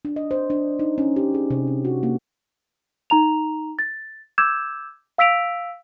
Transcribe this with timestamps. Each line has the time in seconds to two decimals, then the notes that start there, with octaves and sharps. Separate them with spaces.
0.05 D4
0.16 D#5
0.31 C5
0.50 D4
0.79 D#4
0.98 C#4
1.16 G4
1.34 G#4
1.50 C3
1.67 D4
1.85 F#4
2.03 A#3
3.10 D#4 A#5 F7
3.79 A6
4.38 D6 E6 G6 G#6 E7
5.18 F5 E6 B6 D7 F7